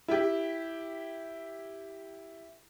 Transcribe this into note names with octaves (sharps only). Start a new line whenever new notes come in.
E4 G4